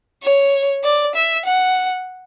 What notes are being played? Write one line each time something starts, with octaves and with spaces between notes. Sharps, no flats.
C#5
D5
E5
F#5